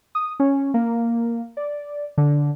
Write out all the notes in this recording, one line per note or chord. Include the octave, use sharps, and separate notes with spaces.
D#6
C#4
A#3
D5
D3